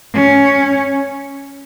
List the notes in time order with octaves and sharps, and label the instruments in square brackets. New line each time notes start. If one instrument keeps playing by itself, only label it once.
[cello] C#4